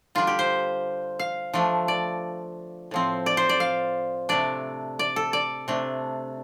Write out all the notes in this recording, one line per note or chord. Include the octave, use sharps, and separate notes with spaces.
D3 G3 D4 F4
G4
C5
F5
F3 A3 D4
D5
A2 F3 C4
D5
C5
D5
F5
C3 A3 D4 D5
D5
A4
D5
C3 A3 D4